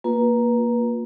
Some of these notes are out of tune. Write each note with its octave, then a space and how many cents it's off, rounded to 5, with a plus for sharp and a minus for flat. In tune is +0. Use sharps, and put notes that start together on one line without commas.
A#3 +0 F4 +35 B4 -25